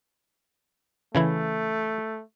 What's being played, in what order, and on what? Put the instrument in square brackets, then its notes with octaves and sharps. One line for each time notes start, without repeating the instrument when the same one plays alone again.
[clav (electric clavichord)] C#3 E3 E4 [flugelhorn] A3